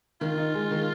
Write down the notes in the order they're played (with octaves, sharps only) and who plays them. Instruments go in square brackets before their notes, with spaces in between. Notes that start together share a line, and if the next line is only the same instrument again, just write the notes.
[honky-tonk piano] D#3 [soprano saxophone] F4
[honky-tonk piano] D#4
G#3
D#3